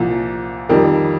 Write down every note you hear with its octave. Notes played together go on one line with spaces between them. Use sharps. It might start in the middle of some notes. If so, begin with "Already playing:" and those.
Already playing: C2 A#2 F3
F2 D#3 G3 A#4